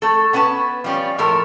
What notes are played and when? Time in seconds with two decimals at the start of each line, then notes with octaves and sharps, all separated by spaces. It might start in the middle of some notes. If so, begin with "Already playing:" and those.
0.02 A3 A4
0.33 B3 C#4 B4 G#5 A5
0.84 F3 G3 C#4
1.18 A2 F3 A4 A#4